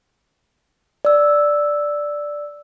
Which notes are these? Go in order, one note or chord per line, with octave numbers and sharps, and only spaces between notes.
D5 E6